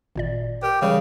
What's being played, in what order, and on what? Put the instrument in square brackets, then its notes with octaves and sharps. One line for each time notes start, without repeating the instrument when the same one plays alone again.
[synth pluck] G#1 A#2 D5
[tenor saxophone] G4 [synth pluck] A#4
[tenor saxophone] C#3 [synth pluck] E3 G3